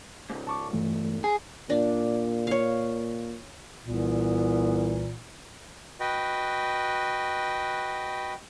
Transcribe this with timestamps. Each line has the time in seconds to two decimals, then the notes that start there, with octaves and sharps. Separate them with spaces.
0.30 C#2 G#2
0.47 A5 C#6 D6
0.73 G2 E3 A3
1.24 G#4
1.70 A#2 D4
2.47 C#5 F5
3.85 C2 A#2 E3 B3
6.00 F#4 B4 D#5 G5